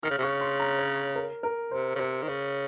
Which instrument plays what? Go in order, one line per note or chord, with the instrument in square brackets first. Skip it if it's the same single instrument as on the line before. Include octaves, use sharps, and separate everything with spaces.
[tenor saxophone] D#3 [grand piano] F6
[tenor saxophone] C#3
C3
[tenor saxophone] C#3 [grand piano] C#6
[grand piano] C6
A#5
C#5
A#4
A#4
[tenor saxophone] C3 [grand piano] C5
[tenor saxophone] C#3
[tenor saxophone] C3 [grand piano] C5
[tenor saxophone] D#3
[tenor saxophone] C#3 [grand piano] C#5